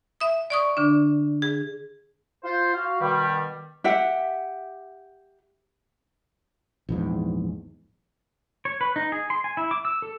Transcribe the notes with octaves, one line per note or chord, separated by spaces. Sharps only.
E5 D#6
D5 C#6 D#6
D3 D4
G#4
F4 C5
F#4 F5
B2 D#3 G3
G4 E5 F#5
A#1 E2 G#2
C#5
B4
D#4
G#4
C6
G#5
E4
D6
E6
A4